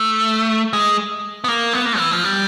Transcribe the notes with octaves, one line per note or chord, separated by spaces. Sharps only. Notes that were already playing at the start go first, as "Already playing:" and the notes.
Already playing: A3
G#3
B3
A#3
B3
A#3
E3
F3
G3